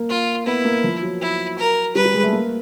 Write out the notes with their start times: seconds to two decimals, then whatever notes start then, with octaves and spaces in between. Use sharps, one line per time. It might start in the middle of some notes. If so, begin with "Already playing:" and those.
Already playing: A#3
0.09 F4
0.46 B3 E4
0.65 A#3
0.84 F3
1.02 F#3
1.21 E4
1.58 A#4
1.95 G3 B4
2.05 G3
2.14 G#3
2.23 A3
2.33 A#3